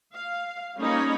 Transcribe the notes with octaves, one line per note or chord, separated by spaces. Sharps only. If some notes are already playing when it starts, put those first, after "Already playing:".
F5
G3 A#3 C#4 D#4 C#5 B5